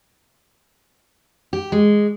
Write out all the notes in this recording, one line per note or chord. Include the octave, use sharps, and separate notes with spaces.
G4
G#3